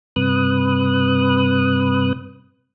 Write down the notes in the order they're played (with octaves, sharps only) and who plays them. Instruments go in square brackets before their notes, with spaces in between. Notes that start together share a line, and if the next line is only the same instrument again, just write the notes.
[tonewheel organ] G2 C3 B4 D#6 F#6